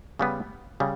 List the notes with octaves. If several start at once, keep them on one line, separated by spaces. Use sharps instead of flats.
C#3 G3 B3
C#3 G3